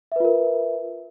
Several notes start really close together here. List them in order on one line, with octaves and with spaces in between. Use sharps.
E5 B4 F4 A#4